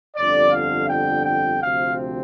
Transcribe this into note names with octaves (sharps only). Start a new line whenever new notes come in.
G1 F2 D3 D5
F5
G5
G5
D2 C3 F3 C4 F5